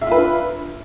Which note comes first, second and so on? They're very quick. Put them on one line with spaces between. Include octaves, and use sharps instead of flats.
E5 F4 B4 D4